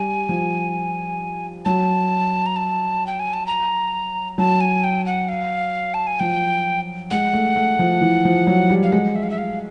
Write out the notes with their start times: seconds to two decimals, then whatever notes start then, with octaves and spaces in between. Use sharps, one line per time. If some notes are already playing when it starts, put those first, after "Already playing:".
Already playing: G3 G#5
0.29 F3
1.65 F#3 A5
2.46 A#5
2.56 A5
3.07 G5
3.19 G#5
3.33 A5
3.47 A#5
4.38 F#3 A5
4.61 G#5
4.84 G5
5.06 F#5
5.29 F5
5.94 A5
6.07 G#5
6.20 F3 G5
7.11 G#3 F#5
7.33 A3
7.56 A3
7.79 F3
8.01 E3
8.25 F3
8.47 F#3
8.70 G3
8.83 F5
8.92 G#3 F#5
9.16 E5
9.23 F5
9.30 E5
9.38 F5